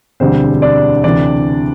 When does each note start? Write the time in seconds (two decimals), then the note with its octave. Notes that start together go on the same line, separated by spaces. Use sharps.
0.20 E1 D2 D3 G3 C4 C5
0.62 D4 D5
1.04 D2 C3 E3 D4 D5